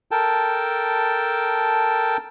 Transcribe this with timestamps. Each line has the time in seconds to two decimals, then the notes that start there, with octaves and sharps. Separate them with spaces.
0.11 A4 A#4 G5 A5